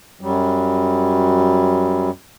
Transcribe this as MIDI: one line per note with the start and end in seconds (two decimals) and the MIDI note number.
0.21 2.10 42
0.21 2.10 54
0.21 2.10 55